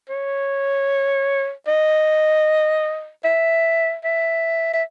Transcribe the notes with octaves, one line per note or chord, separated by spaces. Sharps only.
C#5
D#5
E5
E5
E5